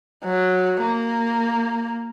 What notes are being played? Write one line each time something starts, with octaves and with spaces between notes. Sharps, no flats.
F#3
A#3